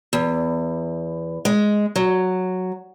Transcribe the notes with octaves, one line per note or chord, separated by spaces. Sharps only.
E2
G#3
F#3